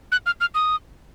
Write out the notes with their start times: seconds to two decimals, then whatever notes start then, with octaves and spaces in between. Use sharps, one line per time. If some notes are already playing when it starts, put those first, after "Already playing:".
0.12 F#6
0.26 F6
0.41 F6
0.55 D#6